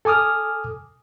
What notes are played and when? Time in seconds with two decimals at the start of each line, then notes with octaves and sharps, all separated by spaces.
0.05 A4 G#5 D6 D#6 F6